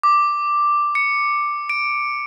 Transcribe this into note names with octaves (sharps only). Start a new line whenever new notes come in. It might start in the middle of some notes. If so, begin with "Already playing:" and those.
D6
C#7
D7